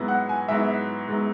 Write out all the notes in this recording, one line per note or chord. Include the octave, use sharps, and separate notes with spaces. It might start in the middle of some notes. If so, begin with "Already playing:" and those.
Already playing: G#2 F#3 B3 E4
F#5
G#5
G#2 F#3 B3 E4 E5
G#2 F#3 B3 E4